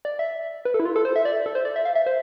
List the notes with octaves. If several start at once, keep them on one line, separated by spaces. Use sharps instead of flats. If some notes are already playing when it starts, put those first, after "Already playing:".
D5
E5
B4
A4
E4
F4
A4
C5
E5
D5
A4
C5
D5
E5
F5
E5
C5